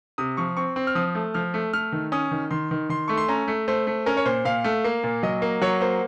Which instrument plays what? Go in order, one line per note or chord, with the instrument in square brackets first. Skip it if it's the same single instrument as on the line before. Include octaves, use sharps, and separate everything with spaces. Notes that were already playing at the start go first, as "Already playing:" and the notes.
[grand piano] C3 D#6
F3 C#6
C4 C#6
C4
F6
F3 D#6
A3
F3 F6
A3
A3 F6
D#3
C#4 D#6
D#3
D#3 C6
D#3
D#3 C6
A3 C#6
C6
C#4 A#5
A3
A3 C5
A3
C#4 A#4
C#5
A#2 C5
A#2 F5
A3
A#3
A#2
F#3 D#5
A#3
F#3 C#5
A#3 C5